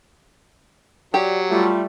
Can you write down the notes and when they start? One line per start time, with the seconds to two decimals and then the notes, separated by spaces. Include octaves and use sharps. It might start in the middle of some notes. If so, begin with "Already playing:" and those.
1.14 F#3 G4 D5
1.50 G3 A3 F4